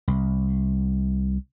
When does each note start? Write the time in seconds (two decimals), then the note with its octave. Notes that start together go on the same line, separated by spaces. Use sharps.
0.08 C2